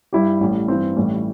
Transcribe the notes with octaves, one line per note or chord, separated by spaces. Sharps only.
G2 G3 E4 G4
A1 A2 G3
G2 E3 C4
A1 A2 E3 G3